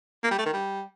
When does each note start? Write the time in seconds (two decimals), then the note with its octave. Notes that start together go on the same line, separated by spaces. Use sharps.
0.24 A#3
0.31 G3
0.38 A3
0.46 D#3
0.53 G3